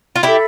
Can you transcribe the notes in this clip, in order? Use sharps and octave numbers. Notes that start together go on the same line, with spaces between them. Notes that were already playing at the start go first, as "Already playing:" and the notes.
F4
E4 G4 A4 E5 B5